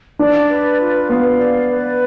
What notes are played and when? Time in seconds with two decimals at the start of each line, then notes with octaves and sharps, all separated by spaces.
0.19 D4 D5
0.50 B4
0.80 F4
1.09 B3 F5
1.39 D5
1.69 B4